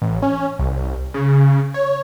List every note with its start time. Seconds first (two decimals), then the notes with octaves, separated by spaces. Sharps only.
0.02 A1
0.22 C#4
0.59 C2
1.14 C#3
1.74 C#5